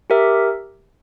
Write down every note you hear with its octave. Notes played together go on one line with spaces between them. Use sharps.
G4 A#4 E5